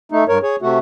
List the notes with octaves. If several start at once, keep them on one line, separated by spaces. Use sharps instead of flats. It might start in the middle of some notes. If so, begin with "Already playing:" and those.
A3 D#4
G2 A#4 C#5
G#4 C#5
C3 A3 F#4